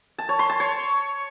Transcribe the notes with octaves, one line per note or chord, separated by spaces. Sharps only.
A5
C#5
C6
A5
C#5